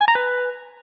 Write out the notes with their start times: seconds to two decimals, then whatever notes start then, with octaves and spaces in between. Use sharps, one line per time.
0.01 G#5
0.08 A#5
0.15 B4